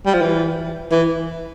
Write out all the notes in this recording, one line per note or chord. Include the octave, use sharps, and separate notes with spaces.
G3
F3
E3
E3